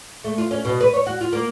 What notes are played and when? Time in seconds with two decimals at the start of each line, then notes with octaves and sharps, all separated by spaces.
0.24 A3
0.38 F4
0.51 C#4
0.65 B2
0.81 B4
0.94 C#5
1.06 F#4
1.21 F4
1.33 A#3